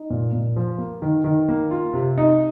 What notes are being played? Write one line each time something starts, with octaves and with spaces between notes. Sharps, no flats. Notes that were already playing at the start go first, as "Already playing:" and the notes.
Already playing: D#4
A#2
A#2
F3
A#3
D#3
D#3
A#3
F4
C3
D#4